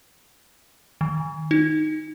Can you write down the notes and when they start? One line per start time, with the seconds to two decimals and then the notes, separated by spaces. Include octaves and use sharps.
1.01 D#3
1.51 D#4